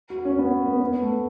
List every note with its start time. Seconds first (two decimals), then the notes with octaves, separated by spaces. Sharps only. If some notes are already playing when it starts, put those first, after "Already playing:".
0.10 F#4
0.25 C#4
0.39 B3
0.67 B3
0.80 B3
1.02 A3